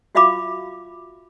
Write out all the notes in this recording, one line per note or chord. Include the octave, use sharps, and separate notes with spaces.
F4 F#4 E5 F5 B5 D6